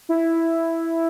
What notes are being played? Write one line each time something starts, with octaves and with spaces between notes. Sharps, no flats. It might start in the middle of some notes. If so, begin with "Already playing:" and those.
E4